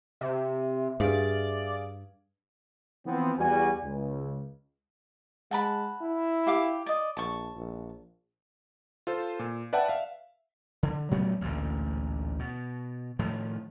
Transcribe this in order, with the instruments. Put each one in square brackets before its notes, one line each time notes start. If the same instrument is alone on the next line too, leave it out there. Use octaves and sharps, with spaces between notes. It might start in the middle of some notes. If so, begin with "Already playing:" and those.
[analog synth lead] C3 [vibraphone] E5
[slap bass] G2 [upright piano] G#4 F5 [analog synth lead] D5
[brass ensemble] E3 F3 B3 C4
E2 G3 F#4 G#5
C#2
[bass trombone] G#3 [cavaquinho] F#5 A5 B5
[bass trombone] E4
[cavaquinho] G4 F5 D6
D5 D#5
[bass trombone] A#1 [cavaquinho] A5 C#6
[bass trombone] A#1
[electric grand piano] F4 A4 C5
A#2
B4 D5 E5 F#5 G5 A5
E5 F5
[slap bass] D3
A#2 F#3 A3 B3
A1 D2 A#2 D3
B2
A2 D#3 F3